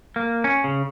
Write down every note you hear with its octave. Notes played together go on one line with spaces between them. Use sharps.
A#3
C#4
C#3